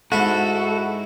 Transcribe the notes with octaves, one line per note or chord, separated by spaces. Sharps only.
G#2 E4 F#4 A4